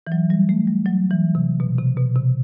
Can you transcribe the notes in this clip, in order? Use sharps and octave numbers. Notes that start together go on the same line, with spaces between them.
E3
F#3
G3
A3
G3
F#3
E3
C3
B2
C3
B2
C3